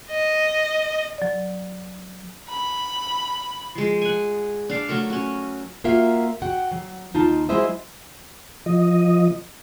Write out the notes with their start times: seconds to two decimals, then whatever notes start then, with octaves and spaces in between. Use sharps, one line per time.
0.11 D#5
1.18 F#3 D5
2.49 B5
3.75 F3 G#3
4.01 F#5 G#5
4.69 D4 F5 D6
4.88 F#3 A3 A#4 C#6
5.10 C#4 F#4
5.84 A#3 F4 F#4 A#4 E5 F5
6.42 F#4 F#5 G5
6.71 F#3
7.14 D#2 D#4 F4 A5
7.49 F#3 G#3 E4 C5 D#5 E5
8.66 F3 D#5